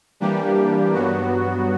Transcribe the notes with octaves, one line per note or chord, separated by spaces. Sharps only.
E3 G3 A#3 D4 G4
G2 F#3 B3 F#4